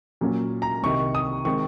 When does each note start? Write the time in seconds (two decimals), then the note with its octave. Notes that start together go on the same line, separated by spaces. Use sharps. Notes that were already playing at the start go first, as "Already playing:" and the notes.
0.21 A#2 F#3 A#3 C#4
0.62 A#5
0.83 C2 C3 D#3 C#6
1.15 D#6
1.45 D#3 G#3 C4 C#6